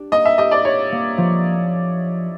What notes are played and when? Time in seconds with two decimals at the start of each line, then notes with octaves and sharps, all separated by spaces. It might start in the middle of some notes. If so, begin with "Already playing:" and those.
Already playing: D4 G4
0.12 A#3 D#5
0.25 E5
0.38 G4 D#5
0.51 D5
0.65 G4 C#5
0.92 A#3
1.18 F3